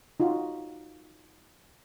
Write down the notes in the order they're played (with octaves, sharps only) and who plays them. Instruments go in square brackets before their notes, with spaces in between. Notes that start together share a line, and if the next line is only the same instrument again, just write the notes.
[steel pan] D#4 F4 F#4